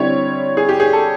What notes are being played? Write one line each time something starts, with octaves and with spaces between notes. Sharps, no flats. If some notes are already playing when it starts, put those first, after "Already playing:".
Already playing: D3 G3 C4 E4 C#5
G#4
G4
G#4
A4